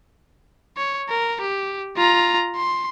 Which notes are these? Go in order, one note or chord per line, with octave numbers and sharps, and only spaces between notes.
C#5
A#4
G4
F4 A#5
C6